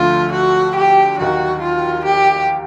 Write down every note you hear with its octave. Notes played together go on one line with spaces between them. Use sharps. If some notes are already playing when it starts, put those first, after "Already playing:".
Already playing: D2 D3 F3 A3 F4
F#4
G4
D#2 D#3 F#3 F#4
F4
G4